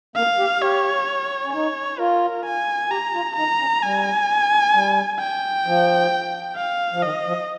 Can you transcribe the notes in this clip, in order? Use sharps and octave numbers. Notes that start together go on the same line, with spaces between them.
A#3 F5
G4
G4 C#5
C#4
D#4 C#5
F4 A#4
G#5
G4 A#5
F4
D#4 A#5
C#4
G3 G#5
G3
G5
F3
F5
F3
D#3 D#5
F3